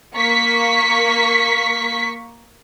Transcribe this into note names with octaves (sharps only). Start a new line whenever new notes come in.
A#3 C#6 B6